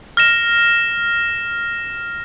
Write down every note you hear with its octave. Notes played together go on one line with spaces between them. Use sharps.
F6 A#6 E7